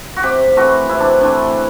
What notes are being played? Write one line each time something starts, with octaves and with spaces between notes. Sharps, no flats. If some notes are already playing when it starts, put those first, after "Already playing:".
F#4
C3 G4
E3 A3 C4 F#4
C3 E4
D4
E3 A3 C4 D4